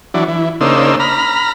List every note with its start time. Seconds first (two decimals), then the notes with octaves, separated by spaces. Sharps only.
0.14 E3 F#3 D4
0.28 E3
0.61 C#3 A#3 D4 D#4 C5 E6
1.00 A#5 B5 F6